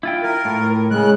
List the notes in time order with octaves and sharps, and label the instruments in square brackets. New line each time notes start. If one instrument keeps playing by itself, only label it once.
[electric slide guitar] E4 F4 G5
[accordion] A#4
[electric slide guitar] A2
[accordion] C#3 F#6 [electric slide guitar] G#3